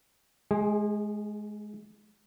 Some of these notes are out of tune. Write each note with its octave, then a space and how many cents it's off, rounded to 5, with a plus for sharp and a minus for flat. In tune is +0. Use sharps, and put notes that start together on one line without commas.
G#3 +20 G#4 -25